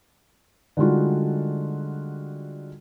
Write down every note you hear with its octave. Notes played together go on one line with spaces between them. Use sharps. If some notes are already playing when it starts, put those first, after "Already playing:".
D3 G3 G#3 D#4 F4 F#4